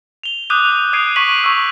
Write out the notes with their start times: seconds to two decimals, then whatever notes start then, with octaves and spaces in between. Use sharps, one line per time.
0.23 F7 G7
0.50 D6 D#6 F#6 G6 D#7 F7
0.77 D#7
0.93 D#6 F#6 G#6 C7 D7 D#7
1.16 C#6 D6 G#6 B6 D#7 F#7
1.43 C#6 D#6 E6 B6